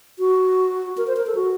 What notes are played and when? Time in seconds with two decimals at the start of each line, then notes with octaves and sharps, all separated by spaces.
0.19 F#4
0.97 A#4
1.07 C5
1.17 A#4
1.27 A4
1.35 F#4